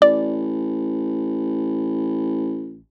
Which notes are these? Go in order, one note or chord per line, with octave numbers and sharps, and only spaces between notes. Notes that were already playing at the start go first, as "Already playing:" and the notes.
A1 D5